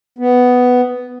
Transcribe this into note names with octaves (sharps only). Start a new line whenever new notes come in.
B3